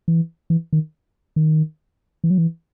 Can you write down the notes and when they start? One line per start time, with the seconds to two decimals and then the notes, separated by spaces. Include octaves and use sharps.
0.08 E3
0.50 E3
0.73 D#3
1.36 D#3
2.24 E3
2.30 F#3
2.38 E3